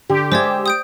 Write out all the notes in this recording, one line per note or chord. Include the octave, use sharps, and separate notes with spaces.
D3 G4
G#3 C5 D5 E5 G#6
D#6 G6 D7